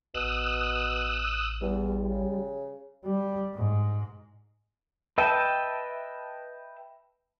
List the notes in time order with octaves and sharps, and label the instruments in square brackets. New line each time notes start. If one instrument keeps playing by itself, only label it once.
[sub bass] A1 [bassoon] B2 [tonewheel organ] D#6 E6 F#6
[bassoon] E2 [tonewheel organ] G3
[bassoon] C#3
[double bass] G3
G#2
[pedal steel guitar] B4 D#5 E5 G5 A5